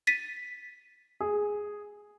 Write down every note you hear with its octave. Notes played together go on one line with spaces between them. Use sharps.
A6 B6 D#7
G#4